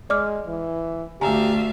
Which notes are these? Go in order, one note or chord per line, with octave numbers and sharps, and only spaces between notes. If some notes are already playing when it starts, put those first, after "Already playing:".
G#3 D5 D6 F6
E3
D2 G4 E5 F5 G#5 A#5